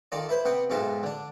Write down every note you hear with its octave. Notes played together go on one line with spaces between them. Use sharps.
D#3 F4 A4 D5
E4 B4 C5
C3 B3 F#5 G5
B1 G#2 B2 F4 A4 E5
D3 D4